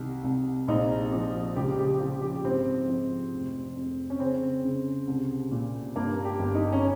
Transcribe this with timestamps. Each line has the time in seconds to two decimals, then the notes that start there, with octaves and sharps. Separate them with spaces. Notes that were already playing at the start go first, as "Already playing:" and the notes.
Already playing: C2 D#3
0.24 C2
0.68 A#1 D#4
1.13 F3
1.56 C#2 G4
1.79 G4
2.00 F3 G4
2.22 G4
2.45 G#2 C4
2.87 F3
3.33 F1
3.76 F2
4.10 C#4
4.20 C#3 C4
4.64 C#3
5.07 C2
5.51 A#2
5.96 G2 A#3
6.25 G4
6.39 G1
6.55 D#4
6.72 C#4